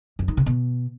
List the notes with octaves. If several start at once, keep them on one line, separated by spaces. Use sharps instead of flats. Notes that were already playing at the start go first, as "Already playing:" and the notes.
F#2
D#3
C3
B2